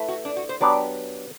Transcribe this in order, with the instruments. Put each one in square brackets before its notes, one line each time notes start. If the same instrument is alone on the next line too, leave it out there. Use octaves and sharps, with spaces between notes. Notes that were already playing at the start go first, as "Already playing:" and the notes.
Already playing: [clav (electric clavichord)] A3 E4 B4 E5
[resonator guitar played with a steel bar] F#4
D4
F#4
C5
[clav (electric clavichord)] F#3 B3 D4 G4 [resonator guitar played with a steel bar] D5